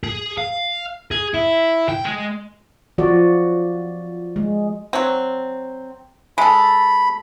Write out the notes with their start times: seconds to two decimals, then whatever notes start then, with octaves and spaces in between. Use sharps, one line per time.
0.03 G#4
0.38 F5
1.11 G#4
1.34 E4
1.89 G5
2.05 G#3
2.98 F3 F#4 D5
4.36 G#3
4.93 F#3 C4
6.38 G#3 A4 B5